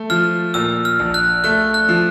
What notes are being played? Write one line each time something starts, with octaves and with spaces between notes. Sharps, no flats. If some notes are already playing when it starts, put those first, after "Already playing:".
Already playing: A3
F3 F6
A#2 E6
F6
A#1
F#6
A3 F#6
F#6
F3